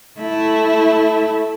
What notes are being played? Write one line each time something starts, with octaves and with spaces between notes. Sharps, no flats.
A3 E4